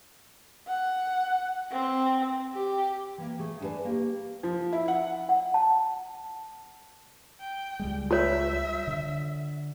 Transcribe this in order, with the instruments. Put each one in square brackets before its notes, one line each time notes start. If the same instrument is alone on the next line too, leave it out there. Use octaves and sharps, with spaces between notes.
[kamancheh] F#5
C4
G4
[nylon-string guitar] E3 A#3
A3 G#4
D4 G4 A4 B4 G#5
A#3 G4
[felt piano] F3
E4
F#5
[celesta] F#5
A5
[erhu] G5
[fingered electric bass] C#2 G3 G#3
[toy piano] F4 C#5 [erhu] E5
[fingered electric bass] D3